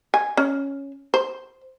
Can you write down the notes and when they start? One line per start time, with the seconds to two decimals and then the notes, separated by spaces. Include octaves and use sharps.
0.14 G#5
0.37 C#4
1.14 C5